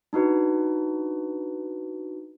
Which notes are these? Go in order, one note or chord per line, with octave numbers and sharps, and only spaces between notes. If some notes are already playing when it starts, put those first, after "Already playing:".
D4 D#4 F#4 B4